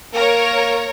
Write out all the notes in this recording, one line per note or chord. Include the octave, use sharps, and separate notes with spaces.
A#3 A#4 C#5